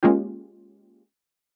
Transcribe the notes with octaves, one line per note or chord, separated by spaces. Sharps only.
G#3 A#3 C#4 F4 G4